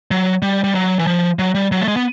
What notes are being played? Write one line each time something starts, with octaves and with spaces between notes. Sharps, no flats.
F#3
G3
G3
F#3
E3
F3
F#3
G3
F#3
A3
G#3
B3